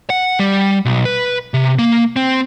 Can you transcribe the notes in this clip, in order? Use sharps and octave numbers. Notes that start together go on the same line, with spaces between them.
F#5
G3
B1
B4
C3
A#3
C4